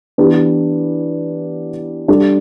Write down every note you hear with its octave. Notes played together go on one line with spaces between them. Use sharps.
E3 B3 D4 G4 B4
G3 D4 A4